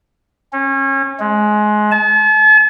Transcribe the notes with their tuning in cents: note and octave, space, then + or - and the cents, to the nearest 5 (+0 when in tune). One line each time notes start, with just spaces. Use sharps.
C#4 -30
G#3 +20
A5 -40